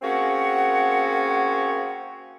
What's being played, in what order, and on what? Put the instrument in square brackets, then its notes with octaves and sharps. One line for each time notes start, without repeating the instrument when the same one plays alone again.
[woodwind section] A#3 C4 C#4 F#4 G#4 F#5